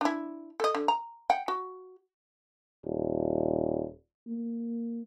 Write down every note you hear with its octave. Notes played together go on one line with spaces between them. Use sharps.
D4 E4
A4 D#5
D3
A#5
F#5 G5
F#4
D#1
A#3